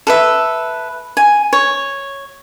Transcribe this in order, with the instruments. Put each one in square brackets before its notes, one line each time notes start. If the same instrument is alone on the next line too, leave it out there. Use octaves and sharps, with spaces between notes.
[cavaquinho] A4 B4 E5
G#5
C#5